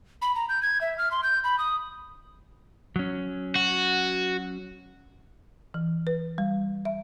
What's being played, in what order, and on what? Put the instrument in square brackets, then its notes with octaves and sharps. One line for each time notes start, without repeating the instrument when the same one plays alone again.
[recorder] B5
A#5
G6
G#6
E5
F6
C6
G6
B5
D#6
[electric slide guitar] F#3 C#4
[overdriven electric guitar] F#4
[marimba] E3
B4
G3
E5